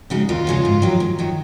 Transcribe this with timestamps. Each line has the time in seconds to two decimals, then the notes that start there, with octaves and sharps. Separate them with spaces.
0.10 C#3 G#3 D#4 F#4
0.29 D#2 F4
0.47 C#3 G#3 D#4 F#4
0.65 G#2
0.82 D#3 F#3
1.00 G#2
1.19 D#3 F#3